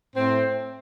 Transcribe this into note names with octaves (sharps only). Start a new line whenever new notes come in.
A2 C4